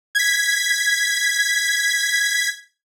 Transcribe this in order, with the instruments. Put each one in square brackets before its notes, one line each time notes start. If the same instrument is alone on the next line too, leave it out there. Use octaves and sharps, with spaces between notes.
[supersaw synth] G#6 B6